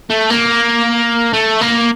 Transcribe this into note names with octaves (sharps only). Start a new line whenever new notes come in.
A3
A#3
A3
A#3